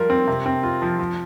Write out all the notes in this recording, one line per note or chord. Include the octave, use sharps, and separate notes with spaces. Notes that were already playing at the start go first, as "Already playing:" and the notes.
Already playing: F3 G3 F4 A#4
C4
C3
C4
F4
F3
F3